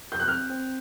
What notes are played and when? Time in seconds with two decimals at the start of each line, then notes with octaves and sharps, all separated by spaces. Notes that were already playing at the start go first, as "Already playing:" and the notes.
0.12 G6
0.20 F#6
0.28 C4 F6
0.50 C4